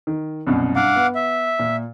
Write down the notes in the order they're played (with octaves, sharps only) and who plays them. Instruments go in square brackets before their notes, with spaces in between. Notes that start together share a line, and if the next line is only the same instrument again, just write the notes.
[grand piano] D#3
C2 F#2 B2
[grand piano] G2 [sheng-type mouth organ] F5 F#5 D6
[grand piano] B3
[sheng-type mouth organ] E5
[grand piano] A#2